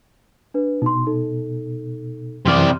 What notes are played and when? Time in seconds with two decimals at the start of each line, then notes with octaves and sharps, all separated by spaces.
0.54 D4 B4
0.82 B2 D#4 C6
1.06 D#4 A4
2.45 F#2 C3 E3 D5 C6 F6